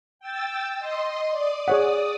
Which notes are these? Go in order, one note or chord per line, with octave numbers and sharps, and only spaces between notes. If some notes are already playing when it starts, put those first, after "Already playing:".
G5 E6 A6
D#5 C6
D5 D#6
G#4 C#5 F#5